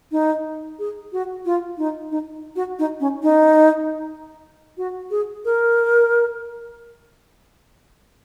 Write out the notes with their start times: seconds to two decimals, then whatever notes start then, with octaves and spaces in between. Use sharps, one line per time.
0.12 D#4
0.79 G#4
1.12 F#4
1.45 F4
1.78 D#4
2.11 D#4
2.56 F#4
2.79 D#4
3.00 C#4
3.23 D#4
4.77 F#4
5.11 G#4
5.45 A#4